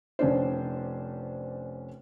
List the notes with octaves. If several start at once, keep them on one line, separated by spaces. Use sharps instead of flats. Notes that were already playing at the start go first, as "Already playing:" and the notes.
F1 C#4 D4 C5